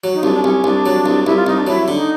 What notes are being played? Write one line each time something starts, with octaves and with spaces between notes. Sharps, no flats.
F#3
D#4
C2 D4
D4
C2 C#4
C2 D4
F#3
C2
C2 E4
F4
C2 D#4
D4
F#3 E4
D3
D#4